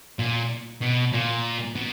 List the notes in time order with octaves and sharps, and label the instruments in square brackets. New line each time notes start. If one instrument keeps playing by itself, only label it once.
[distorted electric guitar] A#2
B2
A#2
B2